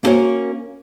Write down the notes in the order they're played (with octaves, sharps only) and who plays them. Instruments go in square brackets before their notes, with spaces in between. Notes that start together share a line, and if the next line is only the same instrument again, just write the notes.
[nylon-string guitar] A#3 B3 C#4 F#4 A#4 C#5